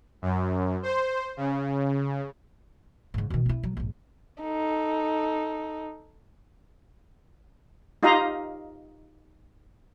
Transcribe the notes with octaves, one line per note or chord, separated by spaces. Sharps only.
F#2
C5
C#3
G#2 C#3
B2 D#3
C4 E4
F#3
A#1 G#2
D#4 A4
D#4 F4 G4 D#5 F5 A#5